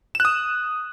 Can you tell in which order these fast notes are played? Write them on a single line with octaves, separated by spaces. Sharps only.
E7 F#6 D#6